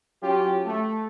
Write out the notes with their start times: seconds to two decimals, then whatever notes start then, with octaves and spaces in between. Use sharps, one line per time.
0.22 F#3 C#4 F4 G4
0.66 A3